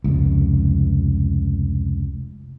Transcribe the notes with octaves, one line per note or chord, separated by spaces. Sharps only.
F1 C#2